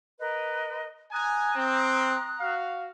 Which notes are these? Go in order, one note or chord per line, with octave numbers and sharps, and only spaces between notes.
A#4 B4 D#5
G#5 A#5 D#6 F#6
C4
F#4 F5